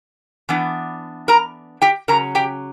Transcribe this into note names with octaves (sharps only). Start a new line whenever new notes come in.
E3 B3 D4
A#4 A#5
G4 G5
C#3 F#3 C#4 A#4 A#5
G4 G5